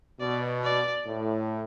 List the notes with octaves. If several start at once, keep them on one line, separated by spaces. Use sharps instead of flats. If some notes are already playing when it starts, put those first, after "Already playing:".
B2 D5
D5
A2